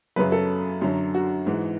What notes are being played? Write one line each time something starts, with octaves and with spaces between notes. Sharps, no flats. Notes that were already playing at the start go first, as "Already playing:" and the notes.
F#2 C#3 F#3 B4
A4
F#2 D3 F#3
F#4
G#2 E3